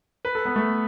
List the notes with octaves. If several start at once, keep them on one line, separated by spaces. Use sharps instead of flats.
B4
A4
B3
A3